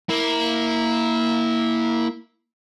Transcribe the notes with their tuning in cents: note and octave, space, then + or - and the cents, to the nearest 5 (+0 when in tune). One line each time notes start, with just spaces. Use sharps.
A#3 +0 E4 -15